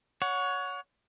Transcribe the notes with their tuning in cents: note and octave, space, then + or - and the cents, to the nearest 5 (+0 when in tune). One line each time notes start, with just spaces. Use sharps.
C#5 +20 F#5 -20